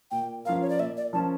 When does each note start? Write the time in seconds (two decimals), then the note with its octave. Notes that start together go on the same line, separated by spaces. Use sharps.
0.11 A#2 G5
0.45 F3 C#4 F4 A#4 F5
0.61 C#5
0.70 D5
0.80 A#2 E5
0.97 D5
1.13 F3 C#4 F4 A#4 A5